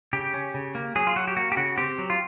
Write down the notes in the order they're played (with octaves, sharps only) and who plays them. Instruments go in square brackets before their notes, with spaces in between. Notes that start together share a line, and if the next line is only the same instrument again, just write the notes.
[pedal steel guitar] C#3 G4
C#4
C#3
A#3
F#3 G#4
F4
F#3 F#4
G4
A#3 F#4
G4
C#3 F#4
C4 G4
F#3
F4